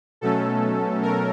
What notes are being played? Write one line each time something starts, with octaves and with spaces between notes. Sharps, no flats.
B2 F#3 A3 C#4 A4
A#4